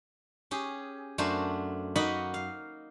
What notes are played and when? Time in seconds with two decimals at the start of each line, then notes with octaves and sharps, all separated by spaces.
0.51 C#4 G4 G#4
1.18 F#2 A3 D4 F#4 C5 A#5
1.96 A#3 D#4 F#4 D#5 F#5 B5
2.34 F5